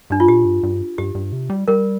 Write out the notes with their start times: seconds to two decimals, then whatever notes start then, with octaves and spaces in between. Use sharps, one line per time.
0.10 G2 D4
0.20 F4
0.28 A#2 G4
0.45 G2
0.63 G2
0.98 G2 G4
1.15 G2
1.32 C3
1.50 G3
1.68 G3 A#4